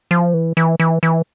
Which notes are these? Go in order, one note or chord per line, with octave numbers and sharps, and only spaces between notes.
F3
E3
E3
E3
E3